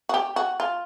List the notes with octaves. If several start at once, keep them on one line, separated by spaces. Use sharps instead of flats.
F#4
G4
F#4
F4